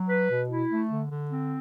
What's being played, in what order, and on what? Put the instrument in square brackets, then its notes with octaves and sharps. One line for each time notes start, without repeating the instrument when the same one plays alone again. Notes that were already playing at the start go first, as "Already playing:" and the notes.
Already playing: [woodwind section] F#3
B4
B2
E4
A3
D3
D3
C4